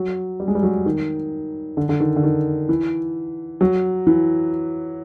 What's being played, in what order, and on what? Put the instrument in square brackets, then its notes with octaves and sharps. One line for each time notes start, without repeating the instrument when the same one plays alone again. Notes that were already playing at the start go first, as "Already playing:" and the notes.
Already playing: [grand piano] F#3
G3
G#3
G3
F#3
D#3
D3
D3
D#3
D3
D#3
E3
F#3
E3